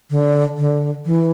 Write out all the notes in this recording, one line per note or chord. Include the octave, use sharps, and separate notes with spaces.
D3
D3
E3